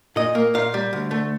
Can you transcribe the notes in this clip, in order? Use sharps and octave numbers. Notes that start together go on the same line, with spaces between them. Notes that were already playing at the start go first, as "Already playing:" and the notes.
A#2 D#5
A#3
A#2 F5
G3
D2
A3